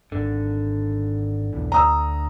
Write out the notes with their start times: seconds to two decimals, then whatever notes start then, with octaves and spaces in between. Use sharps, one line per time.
0.12 G#1 D3
1.53 B1 E2 E3
1.72 D2 A#5 D#6 E6